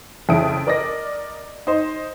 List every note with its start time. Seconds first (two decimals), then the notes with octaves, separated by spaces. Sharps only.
0.29 F2 C#3 E4 D#6 D7
0.67 A#4 D5 D#5 A#6
1.67 D#4 C5 D#5